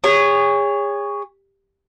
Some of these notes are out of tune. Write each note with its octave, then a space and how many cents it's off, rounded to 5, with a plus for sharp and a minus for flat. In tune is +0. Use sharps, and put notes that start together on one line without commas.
G#4 -35 C#5 +10